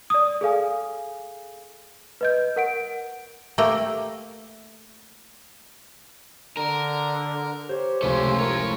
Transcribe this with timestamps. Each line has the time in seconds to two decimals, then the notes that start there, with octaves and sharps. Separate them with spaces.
0.10 D5 D#6
0.41 G#4 A4 F5 G#5
2.21 B4 D#5 G6
2.56 A#4 F#5 D7
3.58 A3 A#3 G4 A#4 G5
6.57 D3 A#4
7.69 G4 C5 C#5
8.02 F1 C#2 C#3 A3 C#4 C6
8.39 A2 A#4 C#5